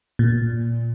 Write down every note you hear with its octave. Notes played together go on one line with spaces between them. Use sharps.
A#2